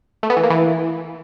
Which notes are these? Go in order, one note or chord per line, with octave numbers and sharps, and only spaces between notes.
A3
B3
E3
A#3
E3